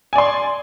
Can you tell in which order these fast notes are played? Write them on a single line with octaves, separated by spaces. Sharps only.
G#5 D5 C6